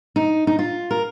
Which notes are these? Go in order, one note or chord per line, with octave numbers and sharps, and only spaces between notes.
D#4
D#4
F4
A#4